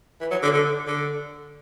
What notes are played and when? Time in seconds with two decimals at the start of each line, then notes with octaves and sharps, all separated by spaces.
0.21 E3
0.31 F#3
0.43 D3
0.54 D3
0.87 D3